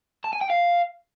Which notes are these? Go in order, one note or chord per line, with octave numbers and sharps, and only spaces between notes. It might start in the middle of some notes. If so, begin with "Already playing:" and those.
A5
G#5
G5
F5